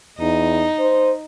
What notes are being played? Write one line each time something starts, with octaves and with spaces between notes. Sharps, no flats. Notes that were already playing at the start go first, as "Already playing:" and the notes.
E2 D#4
C5